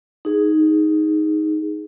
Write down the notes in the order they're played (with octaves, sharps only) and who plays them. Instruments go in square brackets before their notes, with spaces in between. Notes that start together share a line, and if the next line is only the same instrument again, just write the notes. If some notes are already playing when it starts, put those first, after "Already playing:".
[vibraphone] D#4 G#4